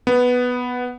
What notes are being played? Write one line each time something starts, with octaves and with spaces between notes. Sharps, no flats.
B3